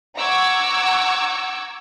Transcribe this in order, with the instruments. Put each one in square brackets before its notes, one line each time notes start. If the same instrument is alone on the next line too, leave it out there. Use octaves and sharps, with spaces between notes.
[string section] F#5 A#5 C#6 D6 E6 G#6